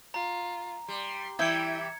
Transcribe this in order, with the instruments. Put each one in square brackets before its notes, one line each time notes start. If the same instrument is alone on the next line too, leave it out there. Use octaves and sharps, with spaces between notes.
[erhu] F4 [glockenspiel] A#5
[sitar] G3 [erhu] C6
[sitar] E3 G3 [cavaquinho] E4 G5 [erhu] E5 [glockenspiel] G#6 C#7